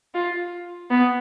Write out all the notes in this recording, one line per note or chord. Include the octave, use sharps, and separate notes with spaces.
F4
B3